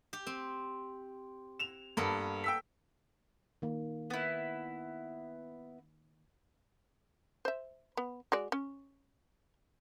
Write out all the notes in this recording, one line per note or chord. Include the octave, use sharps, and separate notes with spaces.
G4
C4
E7 F7
G2 A#3 B3 A4
G5 E6 B6
D#3 A#3
B3 E4
C5 E5
B3
G#3 F#4 D5
C#4